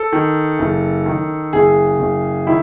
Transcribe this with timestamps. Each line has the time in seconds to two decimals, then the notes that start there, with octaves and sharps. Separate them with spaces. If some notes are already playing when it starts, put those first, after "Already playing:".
Already playing: A4
0.12 D#3
0.59 F#1
1.06 D#3
1.53 F#1 G#4
1.99 F#1
2.47 D#3 E4